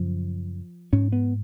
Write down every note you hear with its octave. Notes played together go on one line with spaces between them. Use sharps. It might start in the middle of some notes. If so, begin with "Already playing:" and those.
Already playing: F#2 C#3 F3
G#2 C#4
B3